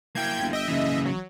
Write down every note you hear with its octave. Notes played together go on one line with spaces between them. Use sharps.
A#3 E4 G5 G6 G#6
G1
D#5 E5 G5
F#1 C#3 E3
F#3